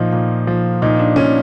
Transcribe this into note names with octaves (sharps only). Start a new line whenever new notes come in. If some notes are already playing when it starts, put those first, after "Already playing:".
Already playing: A#2 F3 D#4
A#2
F3
A#2 D#4
D4
A#2 C#4